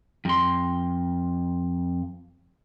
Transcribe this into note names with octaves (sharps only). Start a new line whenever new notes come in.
F2 C6